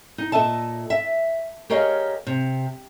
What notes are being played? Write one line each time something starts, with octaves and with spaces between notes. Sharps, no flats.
D#4
A#2 A4 D#5 E5 A5
E5
G4 G#4 A#4 C#5 D#5 F5
C3